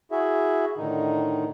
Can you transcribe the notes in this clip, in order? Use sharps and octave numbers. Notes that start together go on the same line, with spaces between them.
E4 F#4 G#4 E5
A2 D3 D#3 D#4